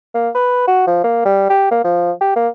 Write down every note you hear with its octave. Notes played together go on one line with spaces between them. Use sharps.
A#3
B4
F#4
F3
A#3
G3
G4
A#3
F3
G4
A#3